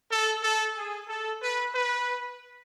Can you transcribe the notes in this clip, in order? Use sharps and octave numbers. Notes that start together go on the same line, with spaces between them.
A4
A4
G#4
A4
B4
B4